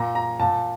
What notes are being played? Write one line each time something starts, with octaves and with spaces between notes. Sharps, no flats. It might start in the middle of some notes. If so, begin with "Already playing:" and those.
Already playing: A#2 A#5
A#5
A#2 A5